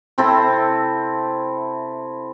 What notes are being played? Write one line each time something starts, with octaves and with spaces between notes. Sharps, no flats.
C3 C4 E4 A4